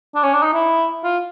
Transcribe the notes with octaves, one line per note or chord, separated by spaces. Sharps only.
D4
C#4
D4
D#4
E4
F4